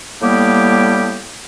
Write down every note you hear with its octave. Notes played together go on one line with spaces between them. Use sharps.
A2 G3 A#3 B3 G4